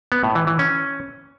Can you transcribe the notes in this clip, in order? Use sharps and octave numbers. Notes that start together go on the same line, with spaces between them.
B3
A2
E3
E3
C#4